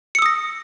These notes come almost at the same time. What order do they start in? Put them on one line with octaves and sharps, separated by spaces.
C#7 E6 D#6 A#6